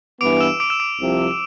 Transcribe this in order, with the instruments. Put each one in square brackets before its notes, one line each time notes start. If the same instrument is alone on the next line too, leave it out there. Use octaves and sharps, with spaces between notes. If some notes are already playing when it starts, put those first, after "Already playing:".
[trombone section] G2 E3 B3 [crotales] D6 D7
[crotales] E6 E7
D6 D7
E6 E7
D6 D7
[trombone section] C2 C3 F3